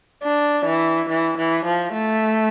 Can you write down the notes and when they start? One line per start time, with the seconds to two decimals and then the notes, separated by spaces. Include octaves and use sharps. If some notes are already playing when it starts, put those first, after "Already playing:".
0.24 D4
0.65 E3
1.09 E3
1.37 E3
1.65 F3
1.93 A3